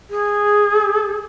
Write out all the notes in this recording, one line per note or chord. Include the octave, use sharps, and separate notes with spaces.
G#4